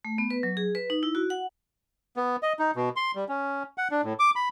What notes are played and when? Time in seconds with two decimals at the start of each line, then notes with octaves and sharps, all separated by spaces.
0.05 A3
0.18 B3
0.30 B4
0.43 F#3
0.57 G#4
0.75 B4
0.90 D#4
1.03 E4
1.15 F#4
1.30 F#5
2.17 B3
2.43 D#5
2.59 D#4
2.76 B2
2.96 C6
3.15 G3
3.29 C#4
3.78 F#5
3.91 D4
4.04 A2
4.19 D6
4.36 B5